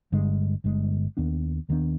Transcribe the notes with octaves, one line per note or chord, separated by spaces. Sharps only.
G1 G2 D3 G#3
G1 G2 D3 G#3
D#2 D#3 B3 D4
D#2 D#3 B3 D4